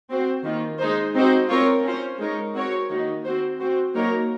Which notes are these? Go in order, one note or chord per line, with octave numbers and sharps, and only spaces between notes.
C4 F#4 C5
D#3 A#3 F4
G#3 D#4 G#4 C5
C4 D#4 F#4 C5
C4 F4 A#4 C#5
C#4 F4 C5
G#3 D#4 A#4 C#5
C4 F#4 A#4 C#5
D#3 A#3 D#4 F#4
C4 F#4 C5
C4 F#4 C5
F#3 A#3 D#4 A#4 C#5